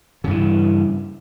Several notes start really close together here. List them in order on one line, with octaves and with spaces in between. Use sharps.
C#3 G2 E3